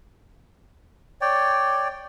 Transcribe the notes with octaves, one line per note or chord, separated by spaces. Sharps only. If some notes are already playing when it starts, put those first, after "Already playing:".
C#5 D5 G5